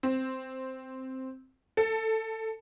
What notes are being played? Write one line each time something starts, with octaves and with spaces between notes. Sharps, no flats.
C4
A4